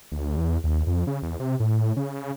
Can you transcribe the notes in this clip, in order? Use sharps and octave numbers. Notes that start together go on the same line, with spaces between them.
D2
E2
D#2
F2
C#3
E2
C3
A2
C#3